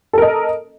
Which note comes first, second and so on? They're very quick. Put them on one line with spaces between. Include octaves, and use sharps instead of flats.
A4 A#4 D#5